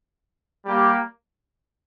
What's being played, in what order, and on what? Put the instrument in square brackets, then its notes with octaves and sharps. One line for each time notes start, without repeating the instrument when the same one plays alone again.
[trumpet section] G3 A#3 G4